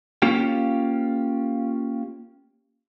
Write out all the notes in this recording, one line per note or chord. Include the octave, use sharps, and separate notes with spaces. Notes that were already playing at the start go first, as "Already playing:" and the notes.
A#3 C#4 F4 G4